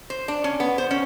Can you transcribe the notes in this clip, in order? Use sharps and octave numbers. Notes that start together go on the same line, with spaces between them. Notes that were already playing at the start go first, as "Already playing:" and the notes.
C5
D4
C#4
B3
C5
C#4